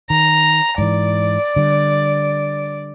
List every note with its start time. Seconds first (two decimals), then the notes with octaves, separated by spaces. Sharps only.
0.10 D#3 A#5
0.78 G#2 E3 D5
1.56 D3 G3